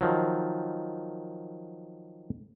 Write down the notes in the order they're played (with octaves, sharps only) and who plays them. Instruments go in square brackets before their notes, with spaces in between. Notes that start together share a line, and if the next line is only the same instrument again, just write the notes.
[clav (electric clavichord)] D#3 F3 F#3